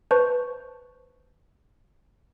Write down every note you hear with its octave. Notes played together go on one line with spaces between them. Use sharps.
B4 C5 A5 C#6